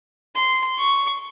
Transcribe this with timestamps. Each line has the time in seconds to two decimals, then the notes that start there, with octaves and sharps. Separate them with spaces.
0.35 C6
0.78 C#6